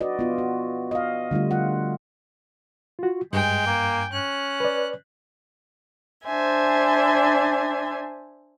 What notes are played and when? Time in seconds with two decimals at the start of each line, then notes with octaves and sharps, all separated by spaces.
0.01 F#4 B4 D5 D#5
0.19 B3 F4
0.38 F#4
0.91 D#5 F5
1.31 D3 G3 A3 F4
1.51 G3 F4 F#5
2.99 F4 F#4
3.33 G2 G#3 G5 G#5
3.66 A#3
4.12 C#4 F#6
4.60 B4 D5
6.24 D4 C5 E5 G#5